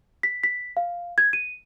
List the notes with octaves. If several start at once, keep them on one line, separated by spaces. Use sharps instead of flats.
B6
B6
F5
G#6
D#7